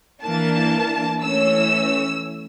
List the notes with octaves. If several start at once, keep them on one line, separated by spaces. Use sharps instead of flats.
E3 A#3 D4 A5
E3 A3 C#4 E6